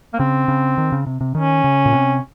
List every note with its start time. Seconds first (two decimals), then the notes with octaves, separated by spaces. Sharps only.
0.14 A#3
0.19 C#3 C4
0.48 C#3
0.78 D#3
0.92 C#3
1.07 C3
1.21 C3
1.35 D#3 C#4
1.64 C#3
1.86 A#2
1.93 C3